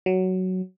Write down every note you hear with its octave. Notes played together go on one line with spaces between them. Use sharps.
F#3